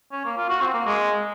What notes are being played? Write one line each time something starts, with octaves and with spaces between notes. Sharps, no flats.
C#4
A#3
F4
F#4
C4
A#3
G#3